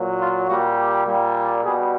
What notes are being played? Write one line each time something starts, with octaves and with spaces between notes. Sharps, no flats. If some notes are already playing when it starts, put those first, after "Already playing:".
Already playing: A#2 F#3
F4
A#2 G3 F#4
G4
A#2 G3
B2 G3 G#4